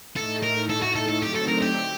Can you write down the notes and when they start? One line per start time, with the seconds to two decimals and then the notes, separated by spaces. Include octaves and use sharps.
0.16 A2 A3 D#4 A4
0.43 A#4
0.69 A2 A3 D#4 A4
0.82 F#4
0.95 A4
1.09 A4
1.22 D3 F#3 A3 C4 D#4 G4
1.35 A4
1.48 A#4
1.62 G4